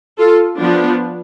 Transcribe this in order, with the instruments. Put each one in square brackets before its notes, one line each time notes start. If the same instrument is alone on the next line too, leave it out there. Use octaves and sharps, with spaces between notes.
[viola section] F4 A4
F3 B3 D4